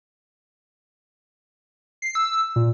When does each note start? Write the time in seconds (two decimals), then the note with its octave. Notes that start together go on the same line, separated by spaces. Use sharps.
2.02 C7
2.15 E6
2.56 A#2